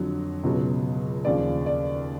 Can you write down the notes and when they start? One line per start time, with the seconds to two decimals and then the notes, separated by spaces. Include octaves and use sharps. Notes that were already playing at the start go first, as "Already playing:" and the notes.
Already playing: F2 D3 F#3
0.43 C#2 B2 F#3
1.25 D#2 C#3 F3 D5
1.66 D5